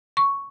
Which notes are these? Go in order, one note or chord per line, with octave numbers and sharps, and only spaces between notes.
C#6